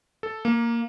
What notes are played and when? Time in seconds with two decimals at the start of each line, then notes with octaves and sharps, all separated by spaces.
0.23 A4
0.45 A#3